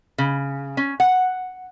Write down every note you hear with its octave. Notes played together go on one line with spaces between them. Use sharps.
C#3
C#4
F#5